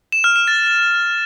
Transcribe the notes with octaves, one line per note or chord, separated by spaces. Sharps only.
E7
F6
E7
A6